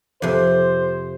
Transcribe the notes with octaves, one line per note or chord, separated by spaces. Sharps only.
F2 C3 C5